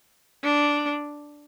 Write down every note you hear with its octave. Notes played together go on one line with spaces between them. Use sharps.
D4